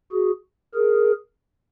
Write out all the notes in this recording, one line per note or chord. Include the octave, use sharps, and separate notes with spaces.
F#4 G#4
G#4 A#4